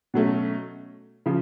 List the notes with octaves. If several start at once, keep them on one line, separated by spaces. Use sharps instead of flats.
B2 F#3 A3 C#4
C#3 F3